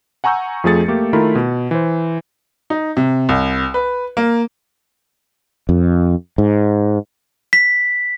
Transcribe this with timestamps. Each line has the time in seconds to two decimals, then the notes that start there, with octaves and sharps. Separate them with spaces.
0.24 F#5 G#5 A#5 C#6 E6 G6
0.64 F2 F3 A3 G#4 A6 C#7
0.88 A3 A#3 G4
1.13 D#3 A3 E4 F4 A#4 B5
1.35 B2
1.71 E3 C5
2.70 D#4
2.97 C3
3.29 C2
3.74 B4
4.17 A#3
5.69 F2
6.38 G#2
7.53 B6